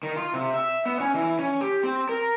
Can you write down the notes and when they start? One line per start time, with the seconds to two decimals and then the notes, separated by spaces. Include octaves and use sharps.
0.03 D#3
0.16 F4
0.34 C3
0.54 E5
0.85 B3
1.00 C#4
1.14 E3
1.39 C#4
1.61 G4
1.84 C4
2.09 A#4